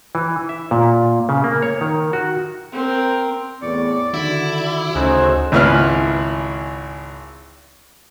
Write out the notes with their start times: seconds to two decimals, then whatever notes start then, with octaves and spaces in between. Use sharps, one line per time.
0.15 E3
0.49 E5
0.71 A#2
1.29 C#3
1.44 A#3
1.62 C#5
1.81 D#3
2.13 F#4
2.72 C4 A#4
3.62 E2 A2 D5 C#6
4.14 D3 D#3 E4 F#4
4.95 D2 C#3 A3 D#4 F#4 G#4 C5 E6
5.52 G#1 C#2 E4 B4 F6